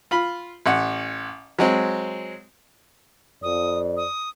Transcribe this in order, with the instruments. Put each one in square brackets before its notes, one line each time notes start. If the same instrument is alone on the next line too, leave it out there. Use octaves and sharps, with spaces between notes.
[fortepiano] F4 B5
A1 F#5
F#3 G#3 C4
[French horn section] F2 D5 [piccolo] D#6
[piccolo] D#6